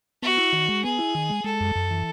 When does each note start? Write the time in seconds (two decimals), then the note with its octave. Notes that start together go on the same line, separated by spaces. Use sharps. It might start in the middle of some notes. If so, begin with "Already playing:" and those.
0.22 B3 F#4
0.37 E4
0.53 D#3
0.68 G#3
0.84 B3 G#4
0.98 E4
1.15 D#3
1.30 G#3
1.44 G#3 A4
1.60 F#2
1.75 F#2
1.91 E3